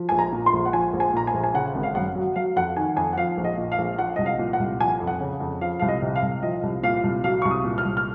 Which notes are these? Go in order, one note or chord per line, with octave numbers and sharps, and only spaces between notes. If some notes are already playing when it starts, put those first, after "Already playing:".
Already playing: F3
A#1 G#5
A#5
A#2
C6
A#1
F#5
F3 G#5
A#1
G#5
A#2 A#5
G#5
A#1
G#5
C#3 F#5
G#1
F5
F#2 F#5
F#3
F#3 F5
F2 F#5
D#3 G#5
F2 G#5
F#5
F3 F5
A#1
D#5
A#2
F5
A#1
F3 F#5
C2 D#5
F5
A#2
F#5
C2
F3 G#5
F2
F#5
C#3
F2
F3 F5
C2 F5
D#5
C3
F5
C2
F3 D#5
C2
A#2 F5
C2
F#3 F5
C2 C#6
D#6
A#2
F6
C2
F6